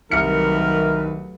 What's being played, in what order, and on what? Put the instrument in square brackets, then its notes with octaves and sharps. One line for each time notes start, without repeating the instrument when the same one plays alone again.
[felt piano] C2 F6 C#7 [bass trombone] D#3 [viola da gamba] F#3 A3 B4 [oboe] A#4